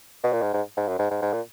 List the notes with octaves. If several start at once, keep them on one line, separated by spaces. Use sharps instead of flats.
B2
A#2
G#2
G#2
G#2
F#2
G#2
G#2
G#2
A#2